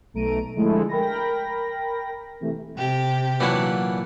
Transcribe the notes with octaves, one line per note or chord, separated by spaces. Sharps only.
B1 A3 A#5 D7 D#7
D3 F3 G#3 A3 E4
A#4 G5 B5 A#6
C3 E3 A3
C3 G4
A#2 E3 F#3 D4 E4 F#5